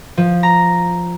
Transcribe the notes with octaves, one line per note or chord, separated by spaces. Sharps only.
F3
A#5